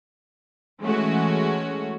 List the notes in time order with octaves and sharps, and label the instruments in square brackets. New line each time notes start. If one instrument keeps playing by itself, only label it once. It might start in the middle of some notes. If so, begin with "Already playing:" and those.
[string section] E3 G#3 A3 C#4 F#4